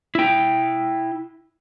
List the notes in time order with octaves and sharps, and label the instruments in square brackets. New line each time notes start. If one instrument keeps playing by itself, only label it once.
[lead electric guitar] E4 G5